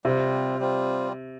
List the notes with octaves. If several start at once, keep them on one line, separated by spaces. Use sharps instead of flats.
C3 G3 C4 F4
G3 C4 F4